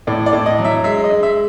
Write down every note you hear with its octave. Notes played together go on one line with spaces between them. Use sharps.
A2 D5
D5
A2
D#5
F#3
E5
G#3 E5
D#5
G#3
E5